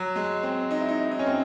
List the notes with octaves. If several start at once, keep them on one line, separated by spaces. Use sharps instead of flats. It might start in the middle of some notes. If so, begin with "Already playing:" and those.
Already playing: F#3
G#3
C4
D#4
E4
D#4
D#4
C#4
C4